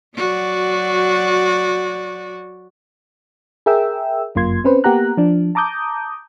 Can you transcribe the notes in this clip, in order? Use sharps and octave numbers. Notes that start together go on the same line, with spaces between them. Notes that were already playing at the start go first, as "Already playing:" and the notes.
F#3 F#4 D5
G#4 A#4 E5 G5 E6
G1 F#2 A#3 F4 C6 G#6
C4 C#4 B4 C5
A#3 B3 G4 F#5 A#5 F#6
F3 D4
A5 A#5 D6 D#6 G6